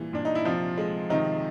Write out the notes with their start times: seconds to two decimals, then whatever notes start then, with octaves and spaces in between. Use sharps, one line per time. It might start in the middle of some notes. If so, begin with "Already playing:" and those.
Already playing: A#2 E3 G3
0.13 A#2 D4
0.25 D#4
0.35 E4
0.45 C3 F3 F4
0.78 G#3
1.10 C3 D#3 D#4